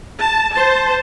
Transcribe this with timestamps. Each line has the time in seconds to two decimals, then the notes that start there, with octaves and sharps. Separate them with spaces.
0.20 A5
0.51 C5 A5